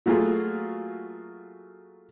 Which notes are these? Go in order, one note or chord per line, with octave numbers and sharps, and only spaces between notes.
F#3 A3 A#3 F4 G#4